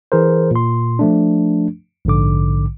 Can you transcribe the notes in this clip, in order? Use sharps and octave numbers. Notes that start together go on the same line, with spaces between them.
E3 G#4 A#4 C5
A#2 C6
F3 A3 D4
A#1 G#2 D3 D6